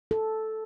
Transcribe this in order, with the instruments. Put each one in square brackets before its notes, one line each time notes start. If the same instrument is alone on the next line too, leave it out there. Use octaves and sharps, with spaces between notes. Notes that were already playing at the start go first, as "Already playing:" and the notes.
[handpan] A4